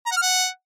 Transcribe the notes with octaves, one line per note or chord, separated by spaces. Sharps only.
A#5
F#5
F6
F#5